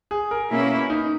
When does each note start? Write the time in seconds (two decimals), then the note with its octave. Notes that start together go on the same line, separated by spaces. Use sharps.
0.11 G#4
0.31 A#4
0.50 B2 A#3 C#4 E4
0.90 D#4